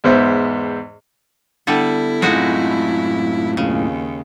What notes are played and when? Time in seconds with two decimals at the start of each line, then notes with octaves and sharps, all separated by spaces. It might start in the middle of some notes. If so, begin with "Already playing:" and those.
0.04 E2 G#2 B3 C5 E5
1.67 D3 G3 B3 E4 A4
2.22 F#2 A2 G#3 C4 D#4 F4 F#4 F5
3.57 D#2 C#3